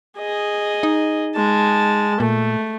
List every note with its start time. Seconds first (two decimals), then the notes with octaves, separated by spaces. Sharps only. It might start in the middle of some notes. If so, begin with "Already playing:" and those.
0.18 G#4 D#5
0.83 D#4
1.35 G#3 A5
2.20 A#2 A3